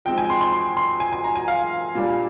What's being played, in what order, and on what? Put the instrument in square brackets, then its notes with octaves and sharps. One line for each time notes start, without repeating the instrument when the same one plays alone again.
[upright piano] F3 G#3 C4 D#4 G5
G#5
C6
C6
C6
C6
G#5
G#5
A#5
G#5
F5
A#2 G3 D4